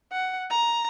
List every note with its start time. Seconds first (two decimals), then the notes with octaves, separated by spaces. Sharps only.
0.12 F#5
0.50 A#5